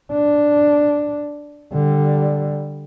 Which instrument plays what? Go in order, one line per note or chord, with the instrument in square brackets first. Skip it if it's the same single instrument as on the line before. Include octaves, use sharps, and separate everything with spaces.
[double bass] D4
D3 G3